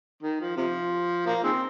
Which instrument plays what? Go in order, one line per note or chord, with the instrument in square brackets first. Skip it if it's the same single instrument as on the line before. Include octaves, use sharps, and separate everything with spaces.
[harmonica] D#3
F3
C3 F3
F3 A#3
D#3 G#3 C4